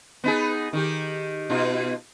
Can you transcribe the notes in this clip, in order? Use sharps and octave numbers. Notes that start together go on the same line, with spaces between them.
B3 D#4 G#4
D#3 D#4 G4
B2 D#4 F4